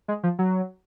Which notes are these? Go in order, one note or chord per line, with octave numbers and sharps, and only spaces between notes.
G#3
F3
F#3